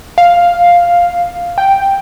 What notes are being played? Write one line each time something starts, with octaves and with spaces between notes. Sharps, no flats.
F5
G5